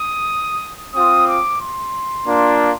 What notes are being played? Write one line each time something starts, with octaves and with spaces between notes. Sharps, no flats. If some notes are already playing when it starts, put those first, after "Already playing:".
Already playing: D#6
C4 F4 D#6
D6
C6
A#3 D4 F4